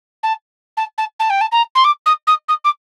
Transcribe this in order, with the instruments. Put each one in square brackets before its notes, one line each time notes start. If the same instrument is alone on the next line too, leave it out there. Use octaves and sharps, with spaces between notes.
[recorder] A5
A5
A5
A5
G5
A5
A#5
C6
D6
D#6
D#6
D#6
D6